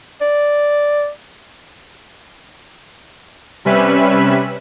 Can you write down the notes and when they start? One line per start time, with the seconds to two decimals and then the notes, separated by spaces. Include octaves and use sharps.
0.21 D5
3.65 C3 G3 C#4 B4 E5 B5